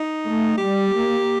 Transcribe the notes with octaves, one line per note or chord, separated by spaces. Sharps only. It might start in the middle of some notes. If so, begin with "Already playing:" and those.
Already playing: D#4
A3
G3 G4
A#3